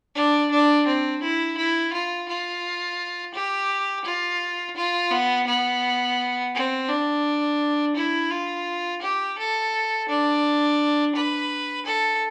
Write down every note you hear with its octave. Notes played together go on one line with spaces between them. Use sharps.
D4
D4
C4
E4
E4
F4
F4
G4
F4
F4
B3
B3
C4
D4
E4
F4
G4
A4
D4
B4
A4